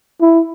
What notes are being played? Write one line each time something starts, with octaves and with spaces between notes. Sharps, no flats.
E4